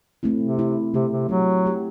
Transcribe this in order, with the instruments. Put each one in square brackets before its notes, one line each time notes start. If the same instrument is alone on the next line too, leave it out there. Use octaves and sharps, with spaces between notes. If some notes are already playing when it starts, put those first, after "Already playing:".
[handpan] A3 C4 E4
[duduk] C3
[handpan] A3 C4 E4
[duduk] C3 [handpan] A3 E4 G4
[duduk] C3
[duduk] F#3 [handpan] A3 E4 G4
[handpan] A3 E4 G4